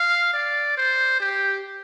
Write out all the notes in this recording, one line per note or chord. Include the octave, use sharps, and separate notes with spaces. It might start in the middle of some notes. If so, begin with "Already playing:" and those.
Already playing: F5
D5
C5
G4